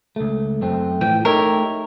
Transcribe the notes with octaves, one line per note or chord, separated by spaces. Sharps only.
C#2 A3
F#2 A3 C4
A2 E3 F3 G5
A3 D#4 G4 A#4 C#5 E5